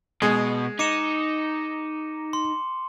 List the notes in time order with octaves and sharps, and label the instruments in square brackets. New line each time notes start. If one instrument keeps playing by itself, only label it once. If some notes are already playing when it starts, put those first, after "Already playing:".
[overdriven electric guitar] B2 [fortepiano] G#3
[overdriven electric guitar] D#4 [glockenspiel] D6 C#7 E7
[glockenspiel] C6